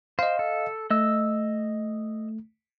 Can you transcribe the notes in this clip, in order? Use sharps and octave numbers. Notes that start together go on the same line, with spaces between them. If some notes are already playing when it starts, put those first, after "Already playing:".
C5 D#5 F5
A4
A3 D#5 E6